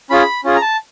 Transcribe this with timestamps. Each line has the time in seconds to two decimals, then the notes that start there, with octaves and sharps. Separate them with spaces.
0.10 C#4 F4 G#4 B5
0.44 C#4 F4 G#4
0.56 A#5
0.61 A5